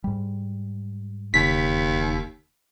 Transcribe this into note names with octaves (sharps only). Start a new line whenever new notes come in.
G#2 G3
E1 D#2 C#3 B6